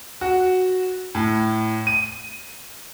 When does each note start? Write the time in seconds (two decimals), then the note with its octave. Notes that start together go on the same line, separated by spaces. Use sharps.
0.21 F#4
1.15 A2
1.87 D#7